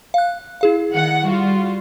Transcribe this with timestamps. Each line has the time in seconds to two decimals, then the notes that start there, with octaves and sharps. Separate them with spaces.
0.14 F5 F#6
0.61 E4 G#4 F5
0.93 D#3 F#5
1.27 G3 F4 F#4